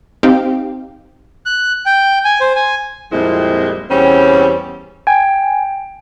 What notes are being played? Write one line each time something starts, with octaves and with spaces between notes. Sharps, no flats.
C4 D#4 G4 F5 G5
F#6
G5
G#5
C5
G#5
F2 A#2 G3 G#3 C4 E4
E2 G3 C4 C#4
G5 G#5